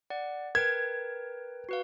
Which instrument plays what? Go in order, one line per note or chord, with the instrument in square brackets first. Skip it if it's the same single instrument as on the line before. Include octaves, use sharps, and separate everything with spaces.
[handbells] D5 F#5
[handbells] A#4 B4 G5 [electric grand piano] G#6
[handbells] F#4 B4 F5